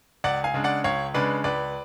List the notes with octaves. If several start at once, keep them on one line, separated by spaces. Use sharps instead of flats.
C#2 D5 F#5
F5 G#5
C#3 G#3 D4
D5 F#5
C#2 C#5 F5
C#3 G#3 D4 B4 D5
C#2 B4 D5